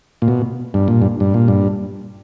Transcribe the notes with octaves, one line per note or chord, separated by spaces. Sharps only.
A#2
B2
G2
A#2
G2
G2
A#2
G2